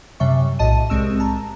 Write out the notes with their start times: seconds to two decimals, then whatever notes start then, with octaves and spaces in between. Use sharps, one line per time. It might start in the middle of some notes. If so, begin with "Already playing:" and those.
0.20 F#2 C3 G3 E5 C#6
0.59 B1 A2 D#5 A5 D#7
0.90 C2 G#3 C4 C#6 E6 E7
1.20 A5 A#5